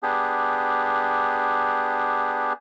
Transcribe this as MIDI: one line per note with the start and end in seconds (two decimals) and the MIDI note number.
0.03 2.53 59
0.03 2.53 62
0.03 2.53 67
0.03 2.53 68